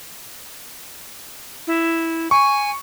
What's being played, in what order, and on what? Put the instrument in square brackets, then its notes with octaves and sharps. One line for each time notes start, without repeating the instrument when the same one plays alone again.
[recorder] E4
[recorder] G#5 [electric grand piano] C#6